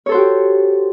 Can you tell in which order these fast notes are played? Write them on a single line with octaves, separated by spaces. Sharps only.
C#5 A4 C5 F#4 G4